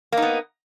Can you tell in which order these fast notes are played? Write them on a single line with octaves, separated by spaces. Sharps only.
A#3 D#4 B3